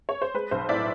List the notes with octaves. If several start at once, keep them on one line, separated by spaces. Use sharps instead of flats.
C#5
C5
G#3 B4
B1 C5
A2 D5 E5